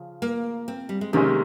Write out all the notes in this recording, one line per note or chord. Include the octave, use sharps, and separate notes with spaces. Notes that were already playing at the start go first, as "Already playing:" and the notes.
Already playing: C#3 F3
A#3
C4
G3
G#3
C3 D#3 G#3 A#3 C#4